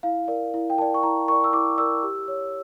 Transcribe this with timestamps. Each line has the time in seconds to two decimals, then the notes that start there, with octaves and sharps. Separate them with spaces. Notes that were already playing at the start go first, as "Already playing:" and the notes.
0.03 E4 F5
0.28 A#4 D5
0.54 E4
0.70 G5
0.78 A#4 D5 A5
0.94 C#6
1.03 E4 A#5
1.28 A#4 D5 C#6
1.44 E6
1.53 E4 D6
1.78 A#4 D5 E6
2.03 G4
2.28 C#5